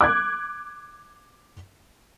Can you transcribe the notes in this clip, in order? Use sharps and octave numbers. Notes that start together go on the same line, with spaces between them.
D6 F#6 G#6